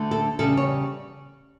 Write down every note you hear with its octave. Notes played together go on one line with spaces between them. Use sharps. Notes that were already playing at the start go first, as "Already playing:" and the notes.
Already playing: D2 D3 A3
A4
E2 C#3 G3 A4
C#5